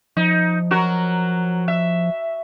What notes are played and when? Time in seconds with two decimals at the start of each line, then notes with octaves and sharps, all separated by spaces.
0.17 F3 D#4
0.71 F#3 F#4 A#4
1.68 E5